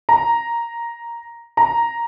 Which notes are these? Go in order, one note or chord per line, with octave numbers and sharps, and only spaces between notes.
A#5
A#5